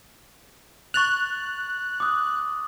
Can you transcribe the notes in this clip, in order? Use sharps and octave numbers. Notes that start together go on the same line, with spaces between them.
C#6 F#6 A6 F7
D6 D#6